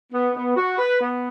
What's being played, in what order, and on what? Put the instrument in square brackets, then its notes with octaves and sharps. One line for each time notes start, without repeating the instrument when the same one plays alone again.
[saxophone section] B3
B3
F#4
B4
B3